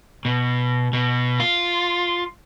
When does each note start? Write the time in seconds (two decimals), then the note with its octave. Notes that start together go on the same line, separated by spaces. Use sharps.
0.25 B2
0.93 B2
1.40 F4